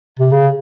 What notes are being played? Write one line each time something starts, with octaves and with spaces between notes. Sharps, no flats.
C3
C#3